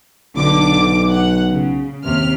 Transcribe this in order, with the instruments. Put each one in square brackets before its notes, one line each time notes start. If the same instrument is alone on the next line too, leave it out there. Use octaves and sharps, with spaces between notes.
[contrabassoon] B1 [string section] D3 D6
[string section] F#5
C#3
D#2 C3 F6